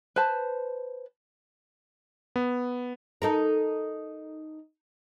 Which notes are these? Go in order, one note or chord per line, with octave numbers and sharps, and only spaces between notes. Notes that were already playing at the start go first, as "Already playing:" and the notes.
B4 C5 A5
B3
D#4 A4 A#4